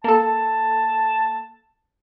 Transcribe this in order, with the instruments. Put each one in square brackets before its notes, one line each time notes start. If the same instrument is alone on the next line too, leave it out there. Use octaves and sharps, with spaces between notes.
[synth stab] A#3 A4 [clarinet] A5